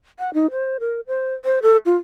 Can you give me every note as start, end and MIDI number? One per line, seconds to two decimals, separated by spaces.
0.19 0.33 78
0.34 0.51 63
0.51 0.77 72
0.80 1.01 70
1.07 1.35 72
1.45 1.59 72
1.62 1.77 69
1.86 1.96 65